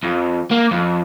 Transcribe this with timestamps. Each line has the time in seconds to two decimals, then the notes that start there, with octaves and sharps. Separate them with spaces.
0.03 F2
0.51 A#3
0.71 F2